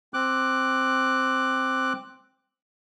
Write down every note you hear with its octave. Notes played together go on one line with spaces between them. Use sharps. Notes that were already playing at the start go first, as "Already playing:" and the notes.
C4 D6 F#6